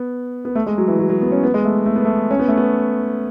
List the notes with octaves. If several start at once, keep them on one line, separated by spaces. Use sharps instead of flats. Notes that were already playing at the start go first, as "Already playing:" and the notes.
Already playing: B3
B3
A3
G#3
F#3
E3
F#3
F#3
B3
C#4
B3
G#3
A3
A3
B3
A3
C#4
B3
A3
B3